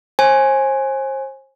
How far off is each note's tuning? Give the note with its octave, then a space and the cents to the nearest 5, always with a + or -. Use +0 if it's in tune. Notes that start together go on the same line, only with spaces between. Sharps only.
C5 +35 G#5 +0